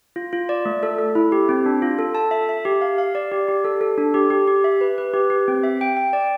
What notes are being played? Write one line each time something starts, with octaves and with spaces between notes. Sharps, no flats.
F4
F4
D5
A3
A4
A4
E4
G4
C4
D4
F4
A4
A5
E5
E5
G4
F5
F5
D5
G4
G4
A4
A4
D4
G4
G4
G4
E5
B4
B4
G4
G4
C4
E5
G5
G5
D5